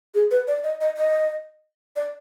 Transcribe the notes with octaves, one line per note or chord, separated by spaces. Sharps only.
G#4
B4
D5
D#5
D#5
D#5
D5